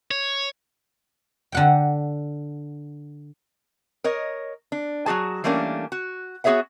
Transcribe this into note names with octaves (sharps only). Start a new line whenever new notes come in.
C#5
D3 F#5 G5
A#4 C#5 D#5
D4
F#3 D4 F#4 G#4 A5
E3 G3 A3 A#3 C#4 D4
F#4
B3 F#4 G#4 C#5 E5 F#5